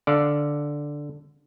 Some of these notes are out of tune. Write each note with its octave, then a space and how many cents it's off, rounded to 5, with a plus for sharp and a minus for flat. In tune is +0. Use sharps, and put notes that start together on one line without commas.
D3 +0 D5 +0 F5 +0